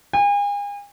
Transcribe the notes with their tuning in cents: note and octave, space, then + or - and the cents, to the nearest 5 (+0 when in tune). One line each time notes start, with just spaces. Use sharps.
G#5 -40